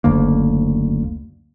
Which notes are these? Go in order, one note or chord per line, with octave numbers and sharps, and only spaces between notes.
F#1 D2 A#3